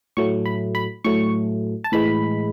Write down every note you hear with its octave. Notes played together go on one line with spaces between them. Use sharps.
A2 F#3 A3 C#6
B5
B5
A2 F#3 A3 C#6
A5
A2 E3 G#3 B5